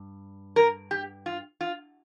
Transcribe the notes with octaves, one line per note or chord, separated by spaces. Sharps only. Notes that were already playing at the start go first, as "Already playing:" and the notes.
Already playing: G2
A#4
G4
F4
F4